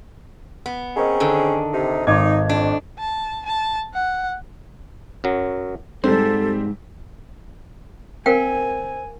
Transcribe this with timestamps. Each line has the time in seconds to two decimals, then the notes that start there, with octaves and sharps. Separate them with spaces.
0.66 B3
0.97 C4 C#4 G#4 A#4 D#5
1.20 D3 D#3 A4
1.73 C3 D#4
2.07 G#1 D#4 C#5 D#5 D6 G#6
2.49 F2 D4
2.99 A5
3.46 A5
3.94 F#5
5.24 F#2 F#3
6.04 G#2 G3 C4 A4 C5
8.26 C4 A#4 F5 G5 G#5